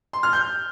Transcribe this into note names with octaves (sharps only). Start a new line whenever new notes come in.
C6
F6
G6